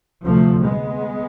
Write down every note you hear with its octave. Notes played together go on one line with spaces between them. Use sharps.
D2 C3 F3 A3
G#3 B3